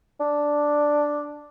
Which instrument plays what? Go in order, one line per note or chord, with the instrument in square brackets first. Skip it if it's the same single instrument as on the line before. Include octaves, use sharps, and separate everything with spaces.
[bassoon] D4